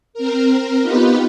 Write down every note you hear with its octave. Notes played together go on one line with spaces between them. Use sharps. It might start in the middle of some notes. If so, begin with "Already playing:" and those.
C4 A#4
B3 D#4 F4 G4 B4